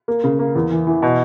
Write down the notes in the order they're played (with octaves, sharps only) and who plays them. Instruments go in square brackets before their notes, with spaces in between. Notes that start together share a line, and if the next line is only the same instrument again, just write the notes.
[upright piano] A#3
C#3
A#3
E2
E3
E3
B2